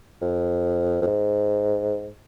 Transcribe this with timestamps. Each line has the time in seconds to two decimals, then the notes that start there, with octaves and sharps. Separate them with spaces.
0.22 F2
1.02 F2
1.07 G#2